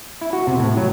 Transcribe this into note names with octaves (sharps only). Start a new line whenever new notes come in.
E4
F#4
C3
A2
F#3